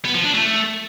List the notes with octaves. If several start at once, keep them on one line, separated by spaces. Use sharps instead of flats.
B3
F3
D4
A3